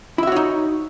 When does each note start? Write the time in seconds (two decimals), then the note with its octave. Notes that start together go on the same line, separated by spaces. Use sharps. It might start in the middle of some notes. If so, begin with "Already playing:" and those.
0.18 E4
0.23 E5
0.27 F#4
0.32 C#5
0.36 D#4